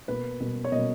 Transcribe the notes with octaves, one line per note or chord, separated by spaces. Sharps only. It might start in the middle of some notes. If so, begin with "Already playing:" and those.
B2 A#3 B4
B2 A#3
C#5
B2 A#3 D#5